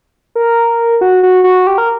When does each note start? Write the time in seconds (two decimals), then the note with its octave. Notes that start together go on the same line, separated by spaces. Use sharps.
0.35 A#4
1.01 F#4
1.23 F#4
1.44 F#4
1.67 G4
1.78 A#4